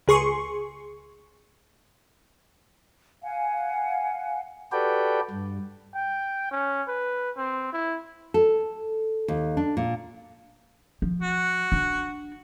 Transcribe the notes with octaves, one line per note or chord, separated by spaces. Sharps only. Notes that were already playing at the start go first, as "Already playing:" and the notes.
C#2 G#4 C6 C#6
F5 F#5 G#5
F#4 G4 A4 B4 D5 G5
G2
G5
C#4
B4
C4
E4
A4
D#2
D4
A#2
F3
F#4
D4